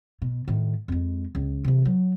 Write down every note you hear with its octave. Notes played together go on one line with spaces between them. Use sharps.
B2
A2 D#3
F2 G#3
C#2
C3 E3
F#3